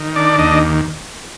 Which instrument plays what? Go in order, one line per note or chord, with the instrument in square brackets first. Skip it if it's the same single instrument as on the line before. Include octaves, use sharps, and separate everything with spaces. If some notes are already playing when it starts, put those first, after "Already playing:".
Already playing: [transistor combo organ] D#3
D4 D5
D#2 D#5